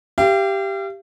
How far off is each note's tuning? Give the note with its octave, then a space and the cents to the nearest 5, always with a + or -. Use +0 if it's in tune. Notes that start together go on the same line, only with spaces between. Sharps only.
G4 +0 F5 -40